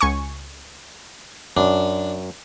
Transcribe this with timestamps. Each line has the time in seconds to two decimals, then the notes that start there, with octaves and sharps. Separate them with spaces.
0.01 C#2 G#5 C#6
1.57 F#2 D4